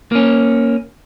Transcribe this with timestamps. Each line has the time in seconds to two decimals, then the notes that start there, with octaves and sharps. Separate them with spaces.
0.12 A#3 C#4